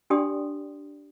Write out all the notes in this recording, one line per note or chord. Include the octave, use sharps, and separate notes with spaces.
D4 G4 D5 G5 C6 D#6